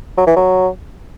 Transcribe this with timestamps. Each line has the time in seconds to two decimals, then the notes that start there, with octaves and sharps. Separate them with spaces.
0.17 F#3
0.27 E3
0.36 F#3